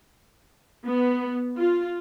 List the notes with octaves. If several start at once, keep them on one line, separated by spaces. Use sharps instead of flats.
B3
F4